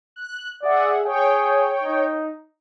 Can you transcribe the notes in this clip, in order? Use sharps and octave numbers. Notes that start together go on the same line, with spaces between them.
F#6
G#4 D5 E5 F#5
G#4 C#5 G5
D#4